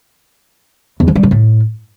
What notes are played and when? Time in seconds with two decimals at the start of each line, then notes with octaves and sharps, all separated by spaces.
1.00 E2
1.08 F3
1.16 G3
1.23 G#2
1.31 A2